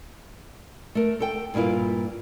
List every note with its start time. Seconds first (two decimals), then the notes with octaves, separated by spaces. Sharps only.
0.95 A3 A#4
1.20 A4 G5
1.54 G2 A#2 A#3 E4 F4